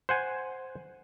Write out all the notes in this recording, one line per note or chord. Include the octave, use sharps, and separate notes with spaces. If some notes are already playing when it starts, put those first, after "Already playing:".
C5 F#5 G#5